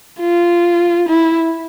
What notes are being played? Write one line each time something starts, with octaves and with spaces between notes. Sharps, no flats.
F4
E4